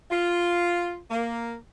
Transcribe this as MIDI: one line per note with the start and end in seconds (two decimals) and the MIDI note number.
0.10 0.97 65
1.10 1.54 58